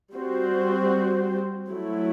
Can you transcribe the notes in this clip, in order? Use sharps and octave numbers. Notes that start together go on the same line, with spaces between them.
G3 C4 F#4 C5
F#3 A3 E4